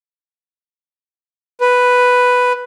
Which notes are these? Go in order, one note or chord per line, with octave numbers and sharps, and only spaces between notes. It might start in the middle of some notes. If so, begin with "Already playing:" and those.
B4